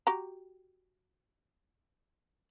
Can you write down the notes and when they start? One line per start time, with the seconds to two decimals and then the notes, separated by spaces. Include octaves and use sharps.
0.07 F#4 G4 A#5